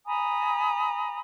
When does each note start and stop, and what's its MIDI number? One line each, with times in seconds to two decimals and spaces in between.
0.05 1.19 80
0.05 1.19 82
0.05 1.19 83
0.05 1.19 87